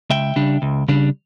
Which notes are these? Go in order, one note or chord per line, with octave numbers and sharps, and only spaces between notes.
C#2 E5 G5
C#3 G3 D4
C#2
C#3 G3 D4